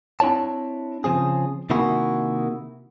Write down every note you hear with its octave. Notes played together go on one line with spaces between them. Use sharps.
C4 D4 E4 C#5 A5
C#3 F3 C4 G#4
C3 D#3 A#3 E4 F#4 G#4